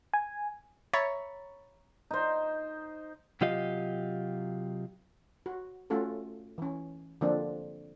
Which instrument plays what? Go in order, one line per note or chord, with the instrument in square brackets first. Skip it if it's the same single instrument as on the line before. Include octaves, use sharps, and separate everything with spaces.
[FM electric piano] G#5
[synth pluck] C#5 E5 A#5 B5 C#6 A6
[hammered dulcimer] D#4 C5
[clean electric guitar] C3 F#3 F4 G4 D#5 F5
[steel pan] F#4
A3 C#4 F4 F#4 A4
E3 C#4
D3 F3 A#3 C4 D4